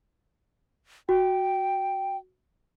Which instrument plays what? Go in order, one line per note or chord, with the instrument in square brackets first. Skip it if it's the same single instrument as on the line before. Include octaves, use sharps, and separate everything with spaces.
[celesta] F#4 [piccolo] G5